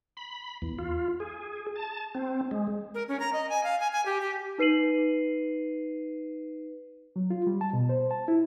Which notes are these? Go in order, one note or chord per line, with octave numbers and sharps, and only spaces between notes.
B5
E2
F4
G#4
A5
C4
G#3
A#4
C#4
A#5
D#5
G#5
F5
G#5
G#5
G4
G4
D#4 B4 C7 D#7 F#7
F#3
F4
G3
A5
B2
C5
A5
E4